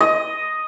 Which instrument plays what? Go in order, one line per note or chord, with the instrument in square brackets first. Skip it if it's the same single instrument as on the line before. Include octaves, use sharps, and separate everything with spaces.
[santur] D#5